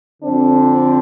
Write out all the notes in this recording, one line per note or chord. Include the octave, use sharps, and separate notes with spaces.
F2 D3 C4 D4